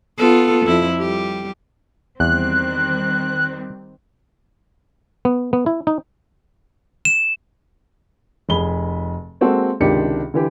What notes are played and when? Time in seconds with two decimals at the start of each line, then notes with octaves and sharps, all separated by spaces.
0.18 B3 F4 A4
0.66 F2 E4
0.99 G3 G4
2.20 E2 D#3 G3 C4 F#6
5.25 B3
5.53 B3
5.66 E4
5.87 D#4
7.05 E7
8.49 F1 G#4 B5 G7
9.41 G#3 A#3 C4 F#4 A4
9.80 C#2 C3 D#3 D4 G4 C#7
10.34 D3 E3 G4